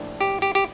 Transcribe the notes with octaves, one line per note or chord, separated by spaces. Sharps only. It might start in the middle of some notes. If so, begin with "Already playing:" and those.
Already playing: A#1 A2 A3 D4
G4
G4
G4